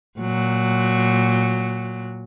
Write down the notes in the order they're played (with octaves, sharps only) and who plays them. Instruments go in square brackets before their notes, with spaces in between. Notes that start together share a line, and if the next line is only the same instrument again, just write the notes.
[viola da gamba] A#2 F#3